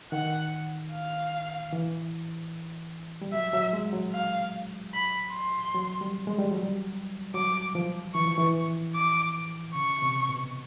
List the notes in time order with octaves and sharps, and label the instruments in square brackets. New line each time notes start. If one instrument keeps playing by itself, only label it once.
[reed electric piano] D#3 [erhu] F#5
[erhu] F5
[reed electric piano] E3
G3
[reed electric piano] F#3 [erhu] E5
[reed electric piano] F#3
G#3
F#3
[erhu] F5
B5
C6
[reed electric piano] F#3
G3
G#3
G3
F#3
G3
[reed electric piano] F#3 [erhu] D6
[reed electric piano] F3
[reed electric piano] E3 [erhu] C#6
[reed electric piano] F3
E3
[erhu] D6
[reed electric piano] C#3 [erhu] C#6
[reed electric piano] C3
B2